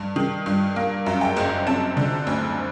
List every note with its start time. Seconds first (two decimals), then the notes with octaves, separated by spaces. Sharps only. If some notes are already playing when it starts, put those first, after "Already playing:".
Already playing: G2
0.16 D#3
0.46 G2
0.76 A#3
1.06 F#2
1.21 G5
1.37 F#1
1.67 C4 A5
1.97 D3
2.27 D2